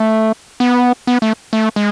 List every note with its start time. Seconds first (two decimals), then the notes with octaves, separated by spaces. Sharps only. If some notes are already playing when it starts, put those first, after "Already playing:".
Already playing: A3
0.60 B3
1.07 B3
1.22 A3
1.53 A3
1.76 G#3